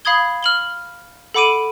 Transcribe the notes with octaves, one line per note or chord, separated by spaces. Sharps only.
F5 B5 D#6 G#6 G7
F6 F#7 G7
A4 F#5 B5 D6 D7 D#7